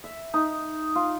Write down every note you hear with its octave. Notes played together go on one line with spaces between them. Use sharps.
E5
D#4
F4